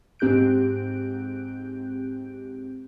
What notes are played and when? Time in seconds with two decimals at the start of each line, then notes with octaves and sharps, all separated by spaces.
0.19 G#2 C4 G4 F#6 G6 D7